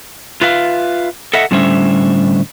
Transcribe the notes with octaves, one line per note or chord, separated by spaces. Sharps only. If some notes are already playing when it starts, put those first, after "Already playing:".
F4 B4 E5 F5
A4 D#5 E5 F#5
A2 D3 G3 C#4 C5 E5